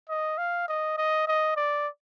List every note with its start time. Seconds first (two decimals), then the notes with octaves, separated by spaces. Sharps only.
0.09 D#5
0.38 F5
0.68 D#5
0.98 D#5
1.28 D#5
1.57 D5